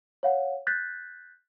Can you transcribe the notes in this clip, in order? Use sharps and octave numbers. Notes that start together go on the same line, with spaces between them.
C#5 F5 F#5
F#6 G6 A6 B6